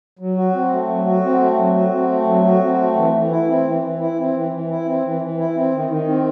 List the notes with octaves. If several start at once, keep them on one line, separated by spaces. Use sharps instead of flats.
F#3
F#4
C4
A3
F#3
F#4
C4
A3
F#3
F#4
C4
A3
F#3
F#4
C4
A3
E3
E3
E4
C4
E3
E3
E4
C4
E3
E3
E4
C4
E3
E3
E4
C4
D#3
D#3
C4